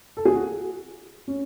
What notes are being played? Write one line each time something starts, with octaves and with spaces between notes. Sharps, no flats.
A4
G#4
F#4
C#4